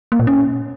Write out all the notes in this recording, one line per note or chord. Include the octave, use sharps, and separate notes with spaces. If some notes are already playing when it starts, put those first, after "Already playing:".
A#3
A#2
C#4